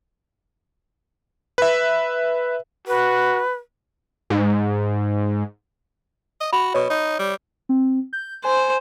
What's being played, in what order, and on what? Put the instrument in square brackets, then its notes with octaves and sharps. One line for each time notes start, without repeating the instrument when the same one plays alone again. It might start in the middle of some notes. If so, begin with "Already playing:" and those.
[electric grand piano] B4 E5
[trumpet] F#4 [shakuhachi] B4
[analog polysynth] G#2
[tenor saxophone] D#5
[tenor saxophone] F#4 [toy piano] B5
[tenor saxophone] B2 [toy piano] C#5 C#6
[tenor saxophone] D#4
G3
[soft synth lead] C4
G6
[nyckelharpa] C5 [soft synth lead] G#5